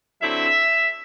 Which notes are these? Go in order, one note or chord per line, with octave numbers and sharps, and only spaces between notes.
D3 F#3 C4 E4 E5